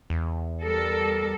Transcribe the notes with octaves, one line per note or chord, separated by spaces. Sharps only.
E2
G3 A4 A#4